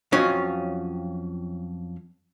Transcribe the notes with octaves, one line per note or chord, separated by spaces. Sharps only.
F2 F#3 C4 C#4 F4 D#5